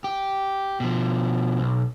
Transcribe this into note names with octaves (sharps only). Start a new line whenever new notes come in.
G4
B2 F3
B1